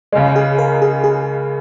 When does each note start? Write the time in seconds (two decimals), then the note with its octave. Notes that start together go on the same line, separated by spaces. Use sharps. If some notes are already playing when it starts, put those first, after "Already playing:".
0.12 C#2 C#3 G#3
0.36 G#4
0.58 A#4
0.82 G#4
1.04 G#4